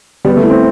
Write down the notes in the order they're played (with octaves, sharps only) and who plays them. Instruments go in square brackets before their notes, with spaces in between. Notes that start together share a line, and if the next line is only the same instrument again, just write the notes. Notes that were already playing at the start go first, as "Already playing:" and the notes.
[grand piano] G3 [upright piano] B3
[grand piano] A3
[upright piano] E3
[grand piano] C4